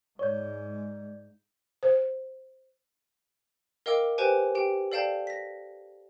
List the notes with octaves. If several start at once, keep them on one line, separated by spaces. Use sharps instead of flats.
G#2 G#3 C#5 D5 G6
C5
A#4 D#5 F5 G5 D6 E6
G4 B4 C5 G5 G#5
G4 G5
A4 D5 F5 G5 A5 G6
A#6 B6